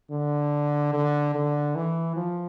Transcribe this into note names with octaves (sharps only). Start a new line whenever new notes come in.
D3
D3
D3
E3
F3